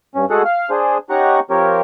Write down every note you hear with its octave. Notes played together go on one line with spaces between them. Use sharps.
G2 C#4
G#3 A3 F#4 G#4 A4 F#5
F5 F6
D4 G#4 C5
C#4 D#4 G4 F#5 A#5 C#6
F3 C4 G4 A#4 C#5